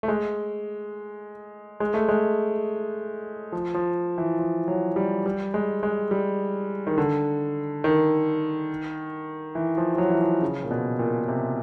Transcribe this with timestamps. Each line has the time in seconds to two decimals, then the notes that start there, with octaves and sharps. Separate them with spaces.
0.03 A3
0.08 G#3
1.80 G#3
1.94 A3
2.09 G#3
3.52 F3
3.74 F3
4.18 E3
4.39 F3
4.68 F#3
4.96 G3
5.26 G3
5.54 G#3
5.83 G#3
6.11 G3
6.87 D#3
6.98 D3
7.84 D#3
9.55 E3
9.77 F3
9.95 F3
9.98 F#3
10.10 E3
10.21 F3
10.41 C#3
10.64 A#2
10.71 B2
10.99 A#2
11.28 C3